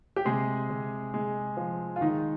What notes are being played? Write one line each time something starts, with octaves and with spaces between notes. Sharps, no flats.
G4
C3 G#3 G#4
C3
G#3
F3
F4
D#3 G#3 D#4